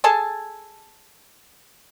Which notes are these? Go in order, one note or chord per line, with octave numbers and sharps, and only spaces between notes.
G#4 A4 G#5 A5